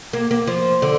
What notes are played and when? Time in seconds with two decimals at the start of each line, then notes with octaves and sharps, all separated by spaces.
0.13 A#3
0.31 A#3
0.47 F3
0.82 D3